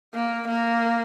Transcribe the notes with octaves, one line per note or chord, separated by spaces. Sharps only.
A#3
A#3